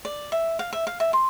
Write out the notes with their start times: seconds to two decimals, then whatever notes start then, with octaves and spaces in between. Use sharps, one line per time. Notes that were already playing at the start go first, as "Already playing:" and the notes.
0.05 D5
0.32 E5
0.59 F5
0.73 E5
0.87 F5
1.00 E5
1.13 C6